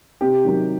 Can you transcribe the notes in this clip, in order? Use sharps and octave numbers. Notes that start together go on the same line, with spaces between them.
C3 G4
D#3 F#3